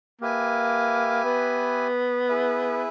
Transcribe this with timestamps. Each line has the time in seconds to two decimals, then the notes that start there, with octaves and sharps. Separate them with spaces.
0.22 A#3 G4 B4 E5 G#5
1.25 B3
2.29 E4 G#4 B4 E5